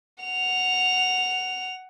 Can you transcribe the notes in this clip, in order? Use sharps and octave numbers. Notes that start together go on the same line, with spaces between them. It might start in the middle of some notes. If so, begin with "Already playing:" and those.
F#5 F7